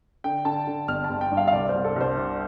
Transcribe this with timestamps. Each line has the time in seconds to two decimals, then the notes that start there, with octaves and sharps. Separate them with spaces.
0.24 D3 G5
0.45 D3 A5
0.67 D3
0.88 G1 F6
1.04 A5
1.09 G1
1.21 G5
1.31 G2
1.37 F5
1.48 F5
1.52 C2 D5
1.69 C5
1.74 C2
1.84 A4
1.96 C2 C5
2.17 C3